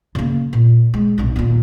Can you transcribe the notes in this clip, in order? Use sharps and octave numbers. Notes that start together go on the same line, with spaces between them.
C#3 A#3
A#2
G#3
D1 B1
D#2 A#2